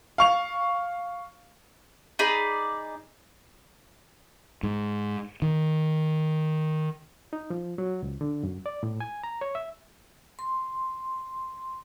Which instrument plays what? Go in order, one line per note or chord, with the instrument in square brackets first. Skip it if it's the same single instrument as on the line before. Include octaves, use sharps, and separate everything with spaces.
[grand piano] F5 C#6 F7
[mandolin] D#4 G#4 D5 B5
[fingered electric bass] G#2
D#3
[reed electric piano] D#4
F3
F#3
C#2
D3
F#2
D5
A2
G#5
A#5
C#5
E5
[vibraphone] C6